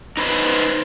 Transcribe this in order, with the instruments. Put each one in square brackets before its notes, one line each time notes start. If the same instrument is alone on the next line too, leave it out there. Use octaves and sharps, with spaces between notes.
[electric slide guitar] D#4 B4 C5